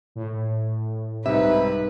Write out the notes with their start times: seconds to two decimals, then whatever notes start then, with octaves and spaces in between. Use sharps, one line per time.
0.15 A2
1.26 C2 G#2 C3 D#4 B4 E5